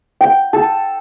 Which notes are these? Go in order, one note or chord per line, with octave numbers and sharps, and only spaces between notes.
G5
A4